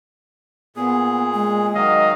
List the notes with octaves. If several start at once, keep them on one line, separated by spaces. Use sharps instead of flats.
A#2 B3 G#4
G#3
D#3 F#3 D#5 F5